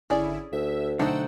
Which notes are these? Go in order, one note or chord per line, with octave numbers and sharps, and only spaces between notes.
G#1 D3 C#4 E4 G#4 D5
D2 E5
B1 D3 A3 D#4 C5 F#5 G5 E6